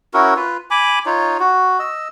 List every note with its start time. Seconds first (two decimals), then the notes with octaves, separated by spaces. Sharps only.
0.14 C#4 E4 F#4 A#4
0.36 F4 B4
0.71 G#5 B5 D6
1.06 D#4 F4 C#5
1.40 F#4
1.79 D#5 E6